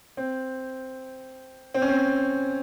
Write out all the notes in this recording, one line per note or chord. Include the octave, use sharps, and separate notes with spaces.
C4
C4
C#4
C4